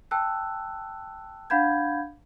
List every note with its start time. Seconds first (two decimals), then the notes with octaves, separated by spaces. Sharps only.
0.11 G5 A5 E6 F#6
1.50 D4 F5 F#5 B5 G6 G#6